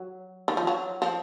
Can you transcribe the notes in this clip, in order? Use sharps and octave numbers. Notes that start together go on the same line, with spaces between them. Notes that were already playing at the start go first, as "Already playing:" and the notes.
Already playing: F#3
D#3
F3
F#3
F3